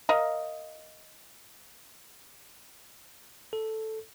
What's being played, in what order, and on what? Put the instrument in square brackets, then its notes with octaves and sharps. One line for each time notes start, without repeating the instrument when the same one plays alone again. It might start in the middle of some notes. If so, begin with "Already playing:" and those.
[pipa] A#4 D#5 F5
[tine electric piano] A4